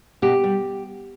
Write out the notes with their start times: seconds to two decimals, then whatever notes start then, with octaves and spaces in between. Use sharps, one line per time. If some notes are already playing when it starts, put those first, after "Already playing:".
0.22 B2 G4
0.44 G3